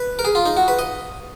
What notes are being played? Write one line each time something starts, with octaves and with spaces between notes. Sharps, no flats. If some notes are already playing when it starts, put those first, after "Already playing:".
Already playing: B4
A#4
G#4
F4
D#4
F#4
B4
D#5